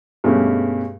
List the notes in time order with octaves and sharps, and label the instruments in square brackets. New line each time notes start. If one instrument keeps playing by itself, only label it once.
[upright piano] G2 B2 G#3 A3 C#4 G4